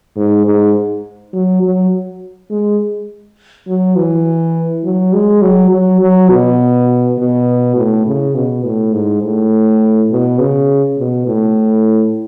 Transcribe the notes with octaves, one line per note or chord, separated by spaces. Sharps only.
G#2
G#2
F#3
F#3
G#3
F#3
E3
F#3
G#3
F#3
F#3
F#3
B2
B2
A2
C#3
B2
A2
G#2
A2
B2
C#3
B2
A2